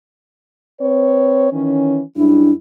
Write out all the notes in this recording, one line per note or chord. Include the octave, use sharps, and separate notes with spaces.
C4 B4 C#5
D#3 E3 C#4
F#2 G3 D4 E4